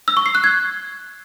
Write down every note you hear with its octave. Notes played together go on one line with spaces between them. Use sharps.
E6
C#6
C7
F#6
G#6